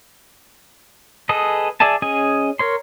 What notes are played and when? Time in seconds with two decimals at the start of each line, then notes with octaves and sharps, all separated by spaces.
1.29 G#4 A4 B4 D#5
1.80 G#4 D5 E5 G#5 A5
2.02 C#4 G#4 D#5 G#5
2.59 A#4 C#5 C6